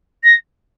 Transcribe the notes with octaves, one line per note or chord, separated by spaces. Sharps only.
A#6